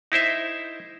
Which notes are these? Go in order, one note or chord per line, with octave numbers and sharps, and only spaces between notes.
D#4 E4 C5 E5